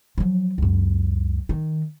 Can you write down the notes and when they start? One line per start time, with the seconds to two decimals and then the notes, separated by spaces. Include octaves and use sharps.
0.18 F3 F#3
0.58 C#2 F#2
1.49 D#3